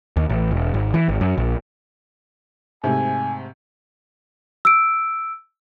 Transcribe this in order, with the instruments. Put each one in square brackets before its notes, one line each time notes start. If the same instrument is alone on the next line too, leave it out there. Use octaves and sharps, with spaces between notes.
[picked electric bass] D#2
A1
E1
G#1
E3
G#1
F#2
A#1
[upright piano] G#2 C3 A3 [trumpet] G#5
[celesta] E6 D7